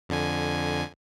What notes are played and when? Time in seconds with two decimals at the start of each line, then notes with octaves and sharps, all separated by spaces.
0.09 F2 D3 G#5